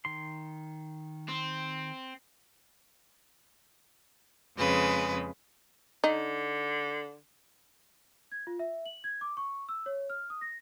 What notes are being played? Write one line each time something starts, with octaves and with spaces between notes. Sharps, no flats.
D#3 C6
C4
F2 C#3 G#3 B4
D3 D#4
G#6
F4
E5
F#7
G#6
D6
C#6
E6
C#5
F6
D#6
A#6